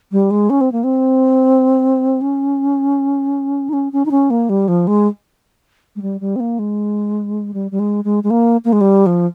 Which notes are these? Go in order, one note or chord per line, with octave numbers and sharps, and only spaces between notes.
G3
G#3
C#4
C4
A#3
C4
C#4
D#4
C#4
C#4
D#4
C#4
A#3
G3
F3
G#3
G#3
G3
G3
C4
A#3
G#3
G3
G3
G#3
G#3
G#3
A#3
A#3
G#3
G3
F3